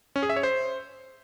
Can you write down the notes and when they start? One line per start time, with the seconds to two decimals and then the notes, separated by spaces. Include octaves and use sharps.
0.16 C#4
0.23 G#4
0.30 E5
0.36 C#5
0.43 C5